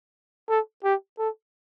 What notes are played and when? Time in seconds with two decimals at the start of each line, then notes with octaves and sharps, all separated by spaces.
0.49 A4
0.84 G4
1.18 A4